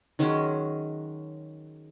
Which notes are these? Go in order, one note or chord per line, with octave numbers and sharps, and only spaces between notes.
D#3 F#3 G#3 C#4